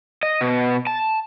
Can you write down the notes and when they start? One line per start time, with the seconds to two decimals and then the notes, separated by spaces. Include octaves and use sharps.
0.23 D#5
0.41 B2
0.87 A5